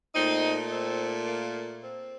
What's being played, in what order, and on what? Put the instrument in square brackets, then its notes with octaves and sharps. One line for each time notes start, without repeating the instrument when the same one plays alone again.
[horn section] A#2 A3 C4 D#4
C4
A#3
C4